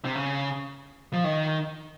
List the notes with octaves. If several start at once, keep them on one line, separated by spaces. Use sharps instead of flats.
C3
C#3
F3
D#3